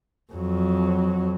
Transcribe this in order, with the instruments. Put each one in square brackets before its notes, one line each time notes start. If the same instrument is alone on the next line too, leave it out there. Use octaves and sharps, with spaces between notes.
[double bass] F2 F#3